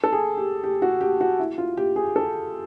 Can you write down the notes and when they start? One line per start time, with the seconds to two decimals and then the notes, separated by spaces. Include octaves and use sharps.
0.04 A4
0.12 G#4
0.37 G4
0.64 G4
0.82 F#4
1.01 G4
1.21 F#4
1.39 E4
1.58 F4
1.77 G4
1.96 G#4
2.16 A4